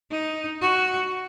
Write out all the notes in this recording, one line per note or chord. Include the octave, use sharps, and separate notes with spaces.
D#4
F#4